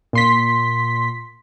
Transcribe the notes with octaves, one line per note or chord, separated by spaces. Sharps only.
A#2 C6 B6